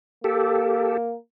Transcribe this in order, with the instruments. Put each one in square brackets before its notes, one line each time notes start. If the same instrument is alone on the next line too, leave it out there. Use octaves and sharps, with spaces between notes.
[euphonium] A#3 [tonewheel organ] G4 A4